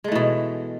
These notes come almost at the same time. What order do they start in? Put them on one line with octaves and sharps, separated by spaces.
G#3 A3 E3 B2